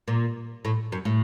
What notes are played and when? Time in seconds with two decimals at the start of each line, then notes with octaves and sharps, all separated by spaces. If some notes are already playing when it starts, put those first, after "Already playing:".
0.08 A#2
0.65 A2
0.92 F#2
1.05 A2